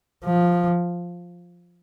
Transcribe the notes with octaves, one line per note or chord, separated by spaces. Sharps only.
F3